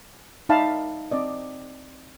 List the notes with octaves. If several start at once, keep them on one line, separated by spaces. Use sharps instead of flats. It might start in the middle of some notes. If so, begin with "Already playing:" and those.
D#4 D5 E5 F5 A5 B5
C4 D5 D#5